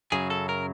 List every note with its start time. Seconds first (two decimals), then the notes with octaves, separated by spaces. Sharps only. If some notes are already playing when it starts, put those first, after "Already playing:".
0.12 F#2 C#3 F#3 G#4
0.30 A4
0.49 A#4